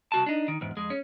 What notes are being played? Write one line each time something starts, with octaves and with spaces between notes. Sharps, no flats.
C2 F#4 A5
D4 D#4
D#3
E2 G#2
F2 G#3
C#4